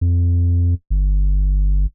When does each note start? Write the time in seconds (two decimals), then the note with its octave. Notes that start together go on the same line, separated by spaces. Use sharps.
0.01 F2
0.90 G1